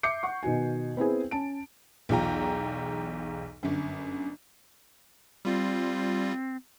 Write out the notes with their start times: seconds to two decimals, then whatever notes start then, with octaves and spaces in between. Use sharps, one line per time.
0.03 E5 D6 G6 C7 C#7
0.23 F#5 C#6
0.43 B2 D#3 F#4 G#5
0.97 B3 C4 E4 G#4
1.31 C#4 A5 D7
2.09 B1 E2 F4 G5 A#5
3.63 G1 F#2
5.45 G3 C4 F4